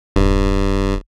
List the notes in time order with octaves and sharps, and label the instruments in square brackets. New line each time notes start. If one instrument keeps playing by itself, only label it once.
[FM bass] D#1 [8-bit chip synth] G2